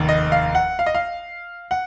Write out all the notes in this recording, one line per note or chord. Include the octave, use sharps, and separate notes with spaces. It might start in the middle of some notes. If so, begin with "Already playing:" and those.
Already playing: F1 D#2 D#3
D#5
F5
F#5
F5
D#5
F5
F#5